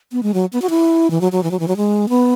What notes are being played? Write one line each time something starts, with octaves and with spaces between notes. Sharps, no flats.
B3
G#3
F#3
B3
F#4
E4
E3
F#3
F#3
E3
F#3
E3
F#3
G#3
B3